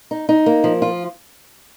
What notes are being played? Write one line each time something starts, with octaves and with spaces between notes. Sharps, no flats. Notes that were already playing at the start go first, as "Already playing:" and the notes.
D#4
D#4
A#3
F3
F4